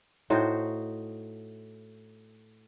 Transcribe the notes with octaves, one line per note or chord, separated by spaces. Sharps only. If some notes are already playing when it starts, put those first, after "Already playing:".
A2 D#4 F#4 C5